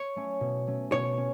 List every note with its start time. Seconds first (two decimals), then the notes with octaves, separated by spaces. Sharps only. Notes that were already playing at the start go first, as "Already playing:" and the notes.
Already playing: C#5
0.16 A3 C#4
0.40 B2
0.67 A3 C#4
0.92 B2 C#5
1.18 C#4